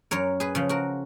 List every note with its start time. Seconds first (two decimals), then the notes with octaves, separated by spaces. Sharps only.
0.11 F#2 A#4 C#5
0.40 G#4 B4
0.55 C#3 F3
0.69 F#4 A#4